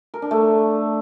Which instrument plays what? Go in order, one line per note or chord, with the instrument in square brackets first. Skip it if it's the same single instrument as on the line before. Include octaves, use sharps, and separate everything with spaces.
[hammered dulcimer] A#4
D4
A3